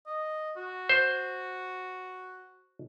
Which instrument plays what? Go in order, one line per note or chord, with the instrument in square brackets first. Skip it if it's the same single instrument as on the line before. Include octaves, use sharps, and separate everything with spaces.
[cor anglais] D#5
F#4
[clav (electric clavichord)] C5